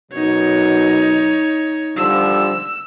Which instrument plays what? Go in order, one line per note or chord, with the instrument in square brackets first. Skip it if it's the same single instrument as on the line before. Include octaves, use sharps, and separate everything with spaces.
[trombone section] F#2 B2 F#3 [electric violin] D#4 C#5
[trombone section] D3 F3 G3 [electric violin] E6